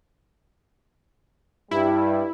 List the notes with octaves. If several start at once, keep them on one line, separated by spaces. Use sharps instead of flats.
G2 G3 E4